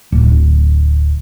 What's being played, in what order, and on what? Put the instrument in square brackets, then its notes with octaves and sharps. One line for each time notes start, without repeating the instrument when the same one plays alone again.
[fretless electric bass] D1